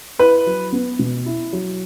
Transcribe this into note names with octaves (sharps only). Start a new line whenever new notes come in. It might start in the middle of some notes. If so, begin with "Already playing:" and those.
E4 B4
F#3
B3
B2
E4
F#3